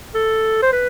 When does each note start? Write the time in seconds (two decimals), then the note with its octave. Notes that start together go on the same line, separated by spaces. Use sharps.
0.15 A4
0.63 C5
0.72 B4